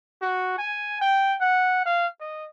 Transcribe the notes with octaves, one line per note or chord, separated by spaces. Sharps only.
F#4
G#5
G5
F#5
F5
D#5